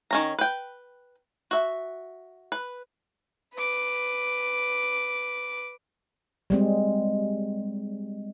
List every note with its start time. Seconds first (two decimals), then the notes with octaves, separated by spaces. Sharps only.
0.11 D#3 C#4 A#5
0.39 B4 G5
1.51 F#4 E5
2.52 B4
3.54 B4 D6
6.50 G3 G#3 C4